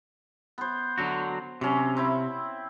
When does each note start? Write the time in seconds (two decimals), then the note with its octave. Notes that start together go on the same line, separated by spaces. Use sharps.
0.58 B3 C5
0.98 D3 F#3 F#4
1.61 C3 F#3 C#4
1.97 C4 E4 B5